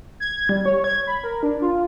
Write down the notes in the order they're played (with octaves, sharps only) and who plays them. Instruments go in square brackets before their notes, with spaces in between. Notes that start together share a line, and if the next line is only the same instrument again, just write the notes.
[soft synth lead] G#6
G3
C#5
G#6
B5
A#4
D4
F4